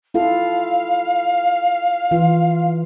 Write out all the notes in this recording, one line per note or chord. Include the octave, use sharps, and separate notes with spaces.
E4 F4 A4 F5
E3 F4